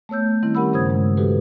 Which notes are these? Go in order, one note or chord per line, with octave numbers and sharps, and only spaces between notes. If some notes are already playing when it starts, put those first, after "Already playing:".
A3 B3 C#5 E6 G6
D#3 G3 C4 E4
C#4 G4 A#4 F#5 B5 E6
G2 C#3 C5 D#6 G#6
G2 G#3
B2 E3 F#4 G4 A4 B4